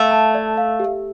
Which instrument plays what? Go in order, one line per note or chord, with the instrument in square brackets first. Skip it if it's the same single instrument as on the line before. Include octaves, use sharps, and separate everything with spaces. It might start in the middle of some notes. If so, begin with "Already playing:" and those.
Already playing: [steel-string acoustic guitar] A3 [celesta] F5
[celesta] A5
D5
F5
G4